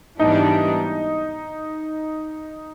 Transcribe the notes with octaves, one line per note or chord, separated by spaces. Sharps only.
G#2 E3 G3 B3 D4 D#4